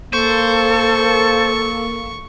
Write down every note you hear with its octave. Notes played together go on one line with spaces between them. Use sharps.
A#3 A4 C5 C#6